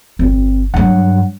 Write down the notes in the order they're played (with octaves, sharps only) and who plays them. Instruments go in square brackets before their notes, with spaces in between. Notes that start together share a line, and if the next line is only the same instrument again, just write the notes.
[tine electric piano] G1 [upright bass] C4
[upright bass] G2 F#3 [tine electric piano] F#5